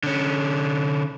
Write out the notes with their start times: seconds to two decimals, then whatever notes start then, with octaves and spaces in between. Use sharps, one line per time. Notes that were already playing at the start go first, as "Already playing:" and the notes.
0.03 D3 C#4